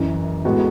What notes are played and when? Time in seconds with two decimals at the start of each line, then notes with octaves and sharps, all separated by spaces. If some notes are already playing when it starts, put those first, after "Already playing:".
Already playing: F#1 F#2 E3
0.45 A2 G#3 B3 F#4